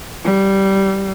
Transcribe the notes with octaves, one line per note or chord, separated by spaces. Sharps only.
G3